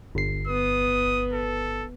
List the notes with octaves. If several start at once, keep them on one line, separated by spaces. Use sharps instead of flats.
G1 C7
B3 D#6
A4